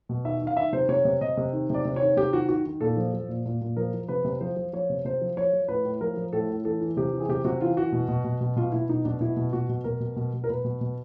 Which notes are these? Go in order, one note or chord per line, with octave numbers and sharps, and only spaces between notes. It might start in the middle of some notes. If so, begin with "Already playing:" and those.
B2
D#3 E5
D#3
F5
D#3 E5
C3 C5
C3 C#5
C3
C3 D#5
C3
D#3
C3 D5
C3
D#3 C#5
C3 G4
D#3 F#4
D#3 F#4
D#3
A#2 A4
F3
F3
A#2
A#2
A#2
F3 A#4
F3
C3 B4
C3
F3 C5
F3
F3 C#5
C3
C3 C5
F3
F3 C#5
F3
A2 B4
A2
F3 A#4
F3
A2 A4
A2
E3 A4
E3
C3 G4
E3
G#4
C3 G4
C3 F#4
E3 F4
E3 F#4
B2
B2
B2
B2
B2 F4
B2 E4
B2 D#4
B2 D4
B2 E4
B2
B2 F#4
B2
B2 A#4
B2
B2
B2
A#4
B2 B4
B2
B2